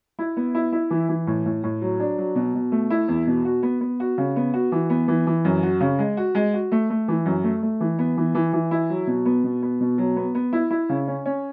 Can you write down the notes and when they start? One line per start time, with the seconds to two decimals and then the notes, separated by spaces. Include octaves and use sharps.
0.19 E4
0.37 B3
0.55 E4
0.73 E4
0.91 E3
1.09 E3
1.27 A2
1.46 A2
1.64 A2
1.82 F#3
2.00 D4
2.18 F#3
2.35 B2
2.55 B2
2.72 A3
2.90 E4
3.08 E2
3.27 B2
3.45 F#4
3.63 B3
3.81 B3
4.00 F#4
4.18 C#3
4.36 B3
4.54 F#4
4.72 E3
4.90 B3
5.08 E3
5.27 E3
5.45 F#2
5.63 F#4
5.80 C#3
5.99 G#3
6.17 F#4
6.35 G#3
6.54 F#4
6.72 A3
6.90 A3
7.08 E3
7.26 F#2
7.44 A3
7.63 A3
7.80 E3
7.99 B3
8.17 E3
8.35 E3
8.53 E3
8.71 E4
8.90 F#3
9.07 B2
9.26 B3
9.44 B2
9.62 B3
9.81 B2
9.98 F#3
10.16 B3
10.35 B3
10.53 E4
10.71 E4
10.89 C#3
11.08 C#4
11.26 C#4